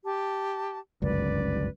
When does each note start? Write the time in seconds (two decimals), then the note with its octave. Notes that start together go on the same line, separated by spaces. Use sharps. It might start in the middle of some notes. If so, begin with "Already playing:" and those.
0.04 G4 A5
1.02 G1 C#2 F#2 B4 D5